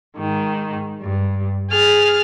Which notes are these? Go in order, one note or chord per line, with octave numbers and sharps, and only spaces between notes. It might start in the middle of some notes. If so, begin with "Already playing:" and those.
G#2 D#3
G2
G#4 F6 A6